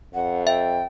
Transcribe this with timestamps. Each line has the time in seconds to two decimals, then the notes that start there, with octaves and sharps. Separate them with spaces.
0.14 F2 F#5
0.47 E5 G5